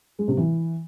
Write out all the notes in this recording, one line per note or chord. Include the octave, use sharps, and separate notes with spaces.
G#3
C3
E3